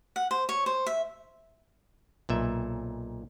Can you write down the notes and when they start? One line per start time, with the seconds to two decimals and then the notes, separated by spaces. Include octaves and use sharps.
0.16 F#5
0.31 C5
0.49 C#5
0.66 C5
0.87 E5
2.29 B1 A#2 E5